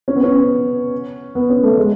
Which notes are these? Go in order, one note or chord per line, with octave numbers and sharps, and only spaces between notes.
C#4
B3
C#4
B3
C#4
A3
G#3